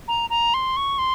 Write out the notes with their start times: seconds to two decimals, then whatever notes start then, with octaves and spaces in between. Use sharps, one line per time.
0.08 A#5
0.30 A#5
0.54 C6
0.76 C#6
0.98 C6